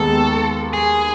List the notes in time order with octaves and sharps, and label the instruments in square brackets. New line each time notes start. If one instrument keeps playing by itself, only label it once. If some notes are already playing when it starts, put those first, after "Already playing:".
Already playing: [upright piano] D#2 D#3 G#3 B3 [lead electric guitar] A4
[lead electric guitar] G#4